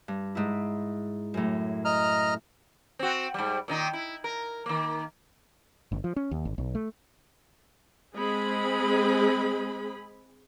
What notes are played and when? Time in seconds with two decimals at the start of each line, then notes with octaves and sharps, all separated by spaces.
0.08 G2
0.35 G#2 E4
1.34 F#2 A2
1.85 D#5 A#5 F6
2.99 C4 F#4
3.34 G#2 G3
3.68 A#2 D#3 D#4
3.93 E4
4.24 A#4
4.66 D#3 A#3
5.92 G1
6.04 F3
6.16 C#4
6.31 D#2
6.45 G#1
6.58 B1
6.75 A3
8.16 G#3 C4 G#4 B5